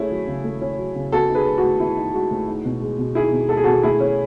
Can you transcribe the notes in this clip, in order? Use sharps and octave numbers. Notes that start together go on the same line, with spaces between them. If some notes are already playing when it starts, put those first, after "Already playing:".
Already playing: A3 C#4 E4 G#4
F#3
C#3
A3
C#4
F#3
C#3
B3 F#4 A4
D#4
G#4 B4
G#3
F#4
A2
B3 E4
D#4
G#3 F#4
A2
D#4
B2
G#3
B2
D#4 E4 G#4
B2
G#3 A4
G#4
B2 F#4 A4
A3 E4 G#4
C#4